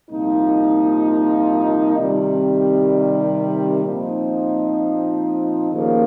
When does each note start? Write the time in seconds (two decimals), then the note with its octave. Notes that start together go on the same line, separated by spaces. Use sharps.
0.10 C2 A#2 F3 A#3 D#4
1.97 C3 D#3 G3
3.84 A#2 F3 C4 D#4
5.71 D#2 C#3 F3 A#3